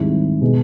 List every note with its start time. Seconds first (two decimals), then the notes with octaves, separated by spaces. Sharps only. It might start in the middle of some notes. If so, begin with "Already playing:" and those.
Already playing: G#2 D#3 G3 C4 E4
0.41 B2 G#3